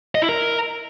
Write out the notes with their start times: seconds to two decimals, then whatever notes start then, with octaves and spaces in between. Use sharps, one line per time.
0.15 D#5
0.22 E4
0.29 A#4